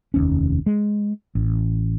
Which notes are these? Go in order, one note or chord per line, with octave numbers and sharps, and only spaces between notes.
F1 D#2 C#4
G#3
A1